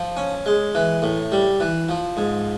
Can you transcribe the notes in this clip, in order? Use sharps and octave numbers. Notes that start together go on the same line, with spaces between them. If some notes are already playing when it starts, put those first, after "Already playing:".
Already playing: F3
C#4
G#3
E3
A2
G3
E3
F3
G#2